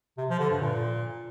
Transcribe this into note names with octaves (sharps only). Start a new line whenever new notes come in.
C3
F3
D3
G2
A#2